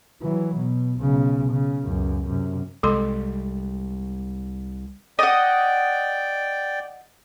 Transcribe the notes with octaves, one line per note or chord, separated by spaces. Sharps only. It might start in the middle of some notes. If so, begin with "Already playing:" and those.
E3 F#3
B2
B1 C#3
C#3
C#2 F#2
F#2 C3
C2 G3 G#3 A4 C6
D5 D#5 F#5 G5